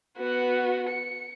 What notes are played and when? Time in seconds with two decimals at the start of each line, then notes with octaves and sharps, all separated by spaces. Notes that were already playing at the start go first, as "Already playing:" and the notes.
0.17 B3 F#4
0.89 C#7